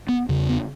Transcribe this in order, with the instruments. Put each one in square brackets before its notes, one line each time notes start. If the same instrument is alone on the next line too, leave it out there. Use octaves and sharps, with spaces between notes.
[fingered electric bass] B3
E2 C#3
B3